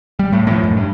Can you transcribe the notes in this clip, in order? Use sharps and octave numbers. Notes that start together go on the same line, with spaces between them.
G3
A2
A2 F3
F#2 A2
G2